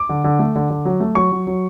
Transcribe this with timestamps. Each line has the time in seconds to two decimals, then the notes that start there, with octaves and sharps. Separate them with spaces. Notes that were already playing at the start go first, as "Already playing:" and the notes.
Already playing: D6
0.09 D3
0.24 D3
0.39 A3
0.56 D3
0.70 D3
0.85 F#3
1.00 A3
1.15 F#3 C#6
1.32 F#3
1.47 F#3